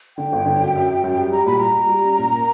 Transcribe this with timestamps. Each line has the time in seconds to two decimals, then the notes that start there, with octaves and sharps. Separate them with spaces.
0.17 D3 G5
0.32 G1
0.46 D3
0.60 F#2
0.75 F#2
0.89 F#2
1.04 F#2
1.18 G3
1.32 G3 A#5
1.46 A#2 B5
1.59 G3 A#5
1.75 G3
1.89 G3
2.04 C#4
2.18 A#2
2.33 A#3